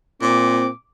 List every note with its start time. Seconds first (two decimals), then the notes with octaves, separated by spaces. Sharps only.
0.22 A#2 C4 D6